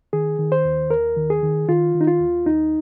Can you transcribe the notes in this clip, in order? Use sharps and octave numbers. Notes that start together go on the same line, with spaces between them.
D#3 G#4
D#3
C5
D#2
D#2 A#4
D#3
G#4
D#3
D#3 F4
D#3
D#4
F4
D#2
D#2 D#4